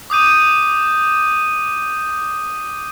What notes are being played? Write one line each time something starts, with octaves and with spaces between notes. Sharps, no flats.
D6 D#6 G6 D#7